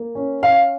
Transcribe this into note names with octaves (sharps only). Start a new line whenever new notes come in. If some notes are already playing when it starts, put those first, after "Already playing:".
Already playing: A#3
C#4
C#4 F5